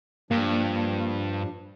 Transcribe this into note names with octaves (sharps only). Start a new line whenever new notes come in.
G2 F3 G3 A#3 D4